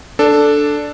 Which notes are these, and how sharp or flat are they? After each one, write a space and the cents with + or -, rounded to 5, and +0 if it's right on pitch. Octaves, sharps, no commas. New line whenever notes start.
D4 +0 A4 +0